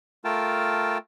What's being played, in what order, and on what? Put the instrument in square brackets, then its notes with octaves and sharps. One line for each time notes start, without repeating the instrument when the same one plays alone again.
[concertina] A3 F4 A#4 G5 A5